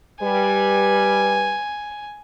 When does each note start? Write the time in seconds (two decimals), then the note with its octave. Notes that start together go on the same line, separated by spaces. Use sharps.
0.22 G3 B4 G#5